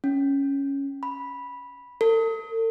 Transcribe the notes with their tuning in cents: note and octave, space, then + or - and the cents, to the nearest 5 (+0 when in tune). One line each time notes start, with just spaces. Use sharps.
C#4 +0
B5 -10
A4 +45